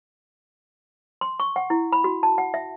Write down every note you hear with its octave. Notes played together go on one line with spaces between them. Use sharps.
C6
C#6
F#5
E4
B5
F#4
A5
F#5
E5